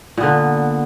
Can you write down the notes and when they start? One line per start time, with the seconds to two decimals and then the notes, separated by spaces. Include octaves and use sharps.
0.17 A#2
0.20 B3
0.23 D3